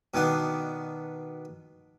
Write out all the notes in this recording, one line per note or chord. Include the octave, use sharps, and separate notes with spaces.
B2 D#3 B3 D4